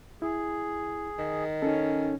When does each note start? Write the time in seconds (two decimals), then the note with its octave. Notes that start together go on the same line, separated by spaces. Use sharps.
0.22 E4 G#4
1.19 D#3
1.62 C#4 D#4 A4